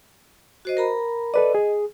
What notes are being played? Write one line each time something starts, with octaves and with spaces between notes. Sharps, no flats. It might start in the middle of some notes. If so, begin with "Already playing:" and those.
F#4 C5 D#5
A#4 A#5 B5
A4 B4 D5 D#5
G#4